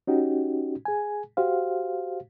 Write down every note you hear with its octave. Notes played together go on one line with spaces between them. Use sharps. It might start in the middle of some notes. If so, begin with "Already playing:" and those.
C#4 D#4 F#4 G4
G#4 G#5
F#4 G4 C5 F5